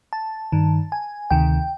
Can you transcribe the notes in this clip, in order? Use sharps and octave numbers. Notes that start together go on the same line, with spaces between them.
A5
G2 D#3
G#5
D2 C3 D#3 G5